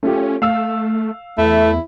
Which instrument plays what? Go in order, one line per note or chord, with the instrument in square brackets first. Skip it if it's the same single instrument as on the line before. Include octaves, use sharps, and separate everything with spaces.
[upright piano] A3 F4 G4 [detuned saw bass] C#4
[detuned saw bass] A3 [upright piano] F5 E6
[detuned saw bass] E2 [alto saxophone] A3 [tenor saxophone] E4